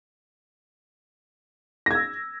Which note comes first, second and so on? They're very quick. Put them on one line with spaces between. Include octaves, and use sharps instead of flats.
A#6 G#6 E6